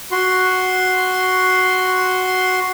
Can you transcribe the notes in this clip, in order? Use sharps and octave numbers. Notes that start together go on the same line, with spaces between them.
F#4 C6